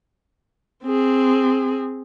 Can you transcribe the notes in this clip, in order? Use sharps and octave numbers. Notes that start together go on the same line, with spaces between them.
C4 G#4